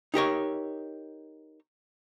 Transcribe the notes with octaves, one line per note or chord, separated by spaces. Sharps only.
D#4 G4 A#4 C#5